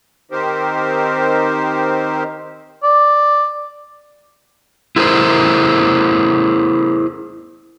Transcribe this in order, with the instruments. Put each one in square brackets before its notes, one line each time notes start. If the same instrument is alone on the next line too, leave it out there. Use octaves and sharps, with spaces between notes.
[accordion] D#3 C4 D#4 G4 A#4 C5
[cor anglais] D5
[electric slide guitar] E4 G#4 A#4 C5